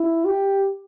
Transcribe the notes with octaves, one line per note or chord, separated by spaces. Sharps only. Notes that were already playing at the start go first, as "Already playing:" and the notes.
Already playing: E4
G4